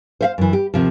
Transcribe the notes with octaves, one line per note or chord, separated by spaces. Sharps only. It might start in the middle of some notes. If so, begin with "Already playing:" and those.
C5 E5 F5
F#2 E3
G4
D#2 C3 F3